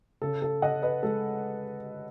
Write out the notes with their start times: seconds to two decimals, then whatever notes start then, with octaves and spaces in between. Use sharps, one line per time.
0.22 C#3 A4
0.42 A4
0.62 C#3 D#5 F#5
0.82 B4 D#5
1.03 G#3 A4